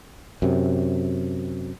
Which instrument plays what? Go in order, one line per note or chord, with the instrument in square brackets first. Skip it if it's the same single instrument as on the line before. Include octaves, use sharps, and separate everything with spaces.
[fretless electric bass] F#2 C3